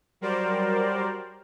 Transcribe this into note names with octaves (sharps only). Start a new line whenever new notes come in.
F#3 G3 A#4 C5 D5